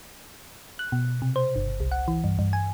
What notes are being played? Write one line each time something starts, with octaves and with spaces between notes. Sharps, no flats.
F#6
B2
C3
C5
G1
C2
F#5
E3
G2
G2
G#5